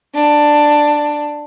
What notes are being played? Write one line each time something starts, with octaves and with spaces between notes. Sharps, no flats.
D4